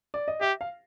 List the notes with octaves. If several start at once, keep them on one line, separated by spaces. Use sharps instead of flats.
D5
D#5
G4 E5
F5